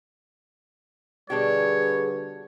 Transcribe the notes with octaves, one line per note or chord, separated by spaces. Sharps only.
B2 D3 G3 D4 G4 G#4 B4 C#5